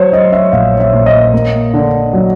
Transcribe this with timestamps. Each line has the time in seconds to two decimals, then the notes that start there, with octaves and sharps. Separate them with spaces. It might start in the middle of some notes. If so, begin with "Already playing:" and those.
Already playing: F#3 C5 C#5
0.12 F#3 D#5
0.32 E5
0.52 A#1 F5
0.80 E5
0.93 A#2
1.06 D#5
1.34 A#3
1.74 D3
2.13 F#3